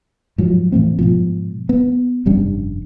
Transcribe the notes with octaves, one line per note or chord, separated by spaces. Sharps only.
G#2 F3 F#3
A2 E3 A3 C4
G#2 B2 F3
B3
F1 G2 G3 C#4